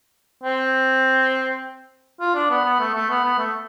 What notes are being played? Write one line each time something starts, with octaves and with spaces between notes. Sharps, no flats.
C4
F4
D4
B3
B3
A3
A3
B3
B3
A3